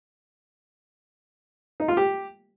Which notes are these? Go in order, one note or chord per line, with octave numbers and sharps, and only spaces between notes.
D#4
F4
G4